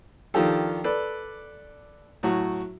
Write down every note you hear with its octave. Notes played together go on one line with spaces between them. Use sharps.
D#3 F3 D4 F4 G4 A4
A4 B4 D5
A2 F#3 F#4